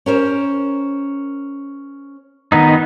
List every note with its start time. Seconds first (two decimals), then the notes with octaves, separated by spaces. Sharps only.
0.06 C#4 A#4 C5
2.52 D#3 B3 D#4